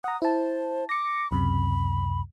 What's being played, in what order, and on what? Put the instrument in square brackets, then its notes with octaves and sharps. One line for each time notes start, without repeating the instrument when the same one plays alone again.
[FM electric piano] F#5 A#5 [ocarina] D#6
[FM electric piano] E4 A5 [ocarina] C5
[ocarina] D6 [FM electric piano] A#6 C#7
[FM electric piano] C#2 F#2 C3 [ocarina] B5